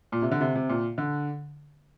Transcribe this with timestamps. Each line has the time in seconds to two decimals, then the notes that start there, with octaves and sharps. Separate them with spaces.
0.12 A#2
0.22 C3
0.31 D3
0.41 C3
0.55 C3
0.69 A#2
0.98 D3